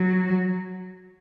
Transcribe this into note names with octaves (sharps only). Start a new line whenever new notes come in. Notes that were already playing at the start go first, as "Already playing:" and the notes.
Already playing: F#3